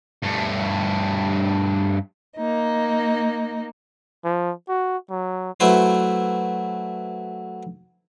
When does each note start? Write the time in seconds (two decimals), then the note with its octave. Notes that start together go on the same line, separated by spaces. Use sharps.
0.22 G2 A3
2.39 A#3 D#4
4.25 F3
4.69 F#4
5.10 F#3
5.60 F#3 A3 E4 B4 C5